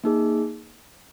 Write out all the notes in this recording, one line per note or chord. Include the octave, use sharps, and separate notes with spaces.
A#3 D#4 G#4